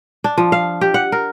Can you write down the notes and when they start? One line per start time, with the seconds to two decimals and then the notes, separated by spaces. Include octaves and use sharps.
0.24 D4
0.38 F3
0.52 F5
0.81 G4
0.94 F#5
1.12 A#4